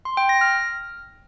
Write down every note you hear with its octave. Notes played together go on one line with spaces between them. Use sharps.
C6
G5
A#6
F6